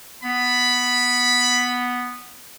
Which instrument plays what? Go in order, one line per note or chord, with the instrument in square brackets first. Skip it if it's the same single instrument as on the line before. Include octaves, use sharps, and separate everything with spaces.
[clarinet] B3 [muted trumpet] B5